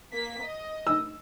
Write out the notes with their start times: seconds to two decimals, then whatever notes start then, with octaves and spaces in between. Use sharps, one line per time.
0.13 A#3 B6
0.44 D#5
0.87 E6